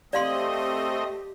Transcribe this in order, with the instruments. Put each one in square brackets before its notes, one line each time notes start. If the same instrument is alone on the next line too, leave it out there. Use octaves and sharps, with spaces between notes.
[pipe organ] A3 C4 D#5 [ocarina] G4 [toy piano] D5 F5 C6